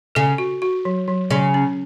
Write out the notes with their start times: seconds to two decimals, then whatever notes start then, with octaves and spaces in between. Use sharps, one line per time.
0.15 C#3 A4
0.38 F#4
0.62 F#4
0.85 F#3
1.08 F#3
1.30 C#3 F#3
1.54 C#4